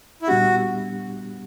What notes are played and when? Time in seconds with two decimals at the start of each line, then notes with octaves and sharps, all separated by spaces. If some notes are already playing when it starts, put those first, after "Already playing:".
0.22 E4
0.28 A#2 G3 B3 D4 F#4 G4